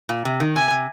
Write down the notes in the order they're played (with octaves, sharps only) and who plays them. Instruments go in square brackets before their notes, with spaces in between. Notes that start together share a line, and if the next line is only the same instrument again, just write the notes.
[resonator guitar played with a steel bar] A#2
C3
D#3
[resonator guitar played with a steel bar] C3 [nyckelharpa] G#5
[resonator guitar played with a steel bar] C3